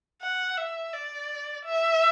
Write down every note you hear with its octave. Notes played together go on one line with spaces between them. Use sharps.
F#5
E5
D5
E5